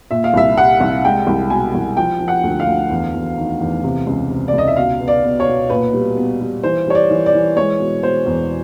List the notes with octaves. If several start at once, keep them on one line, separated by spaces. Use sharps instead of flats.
A#2 E5
F5
C2 E5
G3 F#5
C2
G#3 G5
C2
B2 G#5
C2
F3 G5
F3
F#5
D2
F5
D2
E2
E2
D#3
E2
C3
C#2
C3
D5
C#2 D#5
E5
B2 F5
B3
D5
B3
C#5
B2
A#2 B4
G3
B3
G3
E3 C5
G3 C#5
D5
E3
D5
E3
G#3 C#5
B2
B2 C5
E2